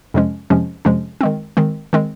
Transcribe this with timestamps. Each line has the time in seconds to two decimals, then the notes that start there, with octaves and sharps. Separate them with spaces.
0.14 F2 C3 F3 G#3 C#4
0.50 F2 C3 F3 G#3 C#4
0.85 F2 C3 F3 G#3 C#4
1.21 D#3 G#3 C4
1.57 D#3 G#3 C4
1.93 D#3 G#3 C4